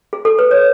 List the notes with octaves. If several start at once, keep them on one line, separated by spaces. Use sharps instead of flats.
G#4
A4
B4
C#5